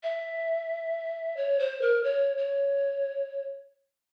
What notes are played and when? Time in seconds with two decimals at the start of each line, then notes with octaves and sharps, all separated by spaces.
0.03 E5
1.37 C#5
1.59 C5
1.82 A#4
2.04 C#5
2.38 C#5